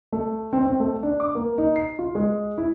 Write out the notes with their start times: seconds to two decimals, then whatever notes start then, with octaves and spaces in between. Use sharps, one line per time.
0.12 A3
0.53 C4
0.65 C4
0.80 A3
1.03 D4
1.20 D6
1.35 A#3
1.58 D#4
1.76 C7
1.99 F4
2.15 G#3
2.58 E4